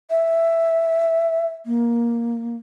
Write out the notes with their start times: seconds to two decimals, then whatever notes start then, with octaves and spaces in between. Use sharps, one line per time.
0.10 E5
1.66 A#3